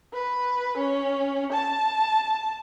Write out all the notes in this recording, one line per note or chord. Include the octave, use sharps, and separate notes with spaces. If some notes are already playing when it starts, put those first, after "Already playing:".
B4
C#4
A5